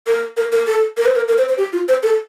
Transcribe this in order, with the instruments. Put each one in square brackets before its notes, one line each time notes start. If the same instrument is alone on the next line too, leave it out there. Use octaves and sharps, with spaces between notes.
[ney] A#4
A#4
A#4
A4
A#4
C5
A#4
A#4
C5
C5
G4
F4
C5
A4